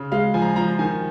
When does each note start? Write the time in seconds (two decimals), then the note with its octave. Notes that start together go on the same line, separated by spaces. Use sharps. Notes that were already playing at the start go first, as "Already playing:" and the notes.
Already playing: C#3
0.12 G#3 F5
0.34 F3 G#5
0.42 A#5
0.48 G#5
0.56 F3 A#5
0.79 D#3 G#5